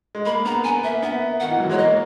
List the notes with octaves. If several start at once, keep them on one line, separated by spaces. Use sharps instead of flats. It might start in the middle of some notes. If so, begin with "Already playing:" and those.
G#3
A#3 B5
B3 A#5
B3 G#5
A#3 E5
B3 E5
D#3 F#5
E3
F#3
G#3 C#5
A#3 D#5